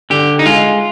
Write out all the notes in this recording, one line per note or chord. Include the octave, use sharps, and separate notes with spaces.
D3 G4
D#4
G#3 F4